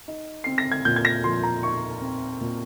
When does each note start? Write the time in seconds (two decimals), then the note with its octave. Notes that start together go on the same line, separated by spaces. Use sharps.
0.08 D#4
0.44 C4 C7
0.58 A#6
0.72 G#6
0.85 A#2 G6
0.96 G#6
1.05 A#6
1.24 F3 C6
1.43 A#5
1.63 D#4 C#6
2.01 C4
2.40 A#2